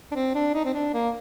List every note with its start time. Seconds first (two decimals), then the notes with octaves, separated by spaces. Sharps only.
0.12 D4
0.15 C4
0.35 D4
0.54 D#4
0.65 C4
0.74 D4
0.94 A#3